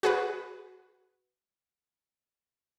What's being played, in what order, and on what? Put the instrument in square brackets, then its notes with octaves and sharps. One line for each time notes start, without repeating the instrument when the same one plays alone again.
[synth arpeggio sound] F#4 G#4 B4